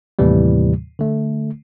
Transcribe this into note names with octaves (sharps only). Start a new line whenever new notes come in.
D#2 A2 C3 E3 G3
D3 A3